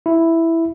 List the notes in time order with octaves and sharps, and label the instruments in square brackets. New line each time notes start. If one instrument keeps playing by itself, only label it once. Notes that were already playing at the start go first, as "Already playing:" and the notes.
[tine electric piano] E4